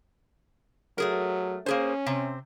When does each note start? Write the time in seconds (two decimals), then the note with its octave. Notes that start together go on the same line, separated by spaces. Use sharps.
0.98 F#3 A3 G#4 A#4
1.66 A#3 C#4 G#4 C5
2.06 C3 C4